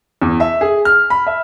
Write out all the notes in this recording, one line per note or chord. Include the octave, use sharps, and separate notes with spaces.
E2
E5
G#4
F6
B5
E5